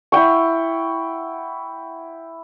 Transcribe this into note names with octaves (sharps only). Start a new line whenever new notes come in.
E4 F#5 G5 C#6